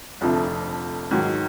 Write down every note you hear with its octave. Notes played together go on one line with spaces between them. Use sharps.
F1 F2 D3 F3 A3
G#2 D#3 F#3